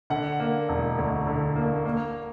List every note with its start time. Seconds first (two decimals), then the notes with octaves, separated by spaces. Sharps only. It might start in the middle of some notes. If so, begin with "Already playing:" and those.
0.10 D3 F#5
0.40 A#3
0.69 E1
0.98 D2
1.27 D3
1.56 A#3
1.85 A#3